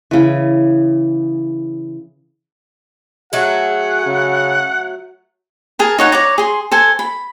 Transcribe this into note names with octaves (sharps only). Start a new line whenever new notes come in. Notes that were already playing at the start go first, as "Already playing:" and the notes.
C#3 E3
F#3 A3 G#4 F#5
C#3
G#4 A#4 A5
D#4 C#5 F#5
C#5 D5 A#5
G#4 C6
A4 C5 G#5
B5